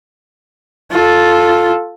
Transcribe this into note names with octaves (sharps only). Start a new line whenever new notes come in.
F4 A4